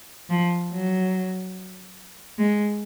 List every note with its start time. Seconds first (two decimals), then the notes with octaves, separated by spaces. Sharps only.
0.29 F3
0.71 F#3
2.38 G#3